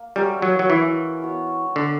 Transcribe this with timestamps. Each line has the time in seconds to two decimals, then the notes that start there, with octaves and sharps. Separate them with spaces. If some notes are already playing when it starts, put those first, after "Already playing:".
Already playing: A#3
0.16 G3 C#4 F#4 A#4 E5
0.42 F#3
0.59 F#3
0.70 E3
1.22 B3 F#4 C#5
1.76 D3